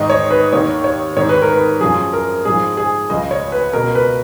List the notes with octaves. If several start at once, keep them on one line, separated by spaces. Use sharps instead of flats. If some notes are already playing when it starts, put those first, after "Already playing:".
Already playing: G#2 D#3 D#5
C#5
B4
D#2 D#3 C#5
C#5
G#2 D#3 C#5
B4
A#4
B4
F#2 F3 G#4
A#4
G#2 F3 G#4
G#4
C#2 C#3 F3 D#5
C#5
B4
C#2 B2 A#4
B4